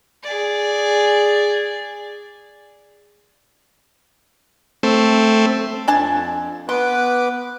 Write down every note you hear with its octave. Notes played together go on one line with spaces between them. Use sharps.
G#4 D5
A3 C4
F2 D4 G#5 A5
B3 B4 C6 D6